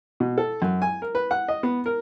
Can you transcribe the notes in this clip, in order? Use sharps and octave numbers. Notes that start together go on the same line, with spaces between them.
B2
A4
F#2
G#5
A#4
B4
F#5
D#5
B3
A#4